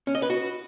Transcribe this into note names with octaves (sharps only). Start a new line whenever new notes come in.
C#4
D#5
B4
F#4